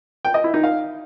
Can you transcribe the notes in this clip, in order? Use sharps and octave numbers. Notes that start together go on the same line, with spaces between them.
G5
D#5
E4
D#4
F5